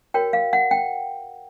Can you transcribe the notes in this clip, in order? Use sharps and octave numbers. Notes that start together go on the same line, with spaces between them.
F#4 A#4 C#5 G5
F5
F#5
G5